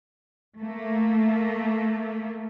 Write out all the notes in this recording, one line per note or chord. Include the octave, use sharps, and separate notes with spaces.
A3 A#3